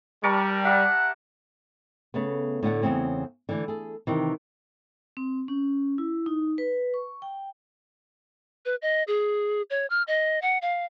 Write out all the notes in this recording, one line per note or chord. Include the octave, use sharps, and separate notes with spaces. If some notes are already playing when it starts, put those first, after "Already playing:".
G3 A#4 A5 C#6
G4 E5 F#5
C#3 A3 B3
A2 D3 F#5 A5
E2 G#2 C#3 C4 C#5
D3 E3 A3
G#4 A4
C3 D#3 E3
C4
C#4
E4
D#4
B4
C#6
G5
B4
D#5
G#4
C#5
F6
D#5
F#5
F5